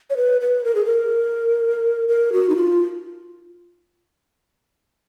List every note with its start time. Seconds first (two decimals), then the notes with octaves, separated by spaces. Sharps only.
0.10 C#5
0.17 B4
0.41 B4
0.64 A#4
0.75 G#4
0.86 A#4
2.08 A#4
2.33 F#4
2.50 D#4
2.56 F4